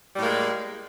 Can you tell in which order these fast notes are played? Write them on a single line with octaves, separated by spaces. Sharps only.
G3 A2 A#3 G#3